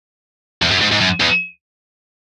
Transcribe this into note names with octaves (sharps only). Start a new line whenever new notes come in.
E2
F#2
G#2
G#2
F#2
E2